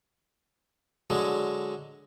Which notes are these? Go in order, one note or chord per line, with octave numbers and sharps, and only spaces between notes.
D3 F#3 G#3